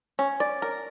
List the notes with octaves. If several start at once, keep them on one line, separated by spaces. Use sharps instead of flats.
C#4
D5
A#4